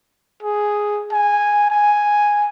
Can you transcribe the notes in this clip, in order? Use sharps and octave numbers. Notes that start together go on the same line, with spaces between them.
G#4
G#5
G#5